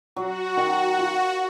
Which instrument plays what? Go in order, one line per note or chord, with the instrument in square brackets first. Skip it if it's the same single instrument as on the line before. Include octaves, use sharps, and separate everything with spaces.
[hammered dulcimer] F#3 [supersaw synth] F#4
[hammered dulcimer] D#3
F4